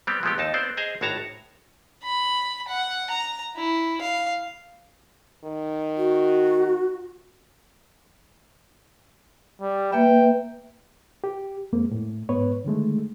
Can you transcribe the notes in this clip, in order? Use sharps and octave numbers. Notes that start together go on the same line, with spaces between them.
G3 B3 C4 G4
F3 G#3 A3 B3 C4 G4
D#2 D#4 A5
B3 C4 C5 D5
G#4 C5 D#5 G#5 A#5
G#1 A2 F#4 C#5 A5 A#5
B5
F#5
A#5
E4
F5
D#3
F#4
G3
A#3 B4 E5 G5
G4
F2 G#3 A#3 C4
A2
G#2 B3 B4 C#5
D3 D#3 G#3 A3